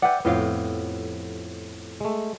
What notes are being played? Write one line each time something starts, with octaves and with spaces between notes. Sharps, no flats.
B4 D5 E5 F#5 G5
F2 A2 B3 F4 G4 F5
G#3 A3